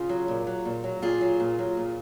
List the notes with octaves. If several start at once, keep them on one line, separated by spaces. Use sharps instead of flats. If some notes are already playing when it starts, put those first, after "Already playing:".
Already playing: C#3 F4 G#4
F#3
A#2
F#3
A#2
F#3
A#2 F4 G#4
F#3
A#2
F#3
A#2